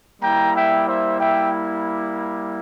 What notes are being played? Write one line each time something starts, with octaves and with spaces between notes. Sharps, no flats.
G3 A#3 E4 G5 A#5
E5 G5
C5 E5
E5 G5